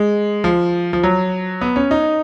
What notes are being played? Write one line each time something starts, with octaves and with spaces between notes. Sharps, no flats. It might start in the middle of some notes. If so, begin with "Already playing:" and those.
Already playing: G#3
F3
F3
F#3
B3
C#4
D#4